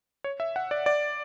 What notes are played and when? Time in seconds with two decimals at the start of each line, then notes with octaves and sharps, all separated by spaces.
0.24 C#5
0.40 E5
0.56 F#5
0.71 D5
0.86 D5